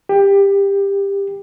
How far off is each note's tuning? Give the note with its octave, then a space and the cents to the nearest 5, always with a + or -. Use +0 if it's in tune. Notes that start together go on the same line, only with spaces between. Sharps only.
G4 +20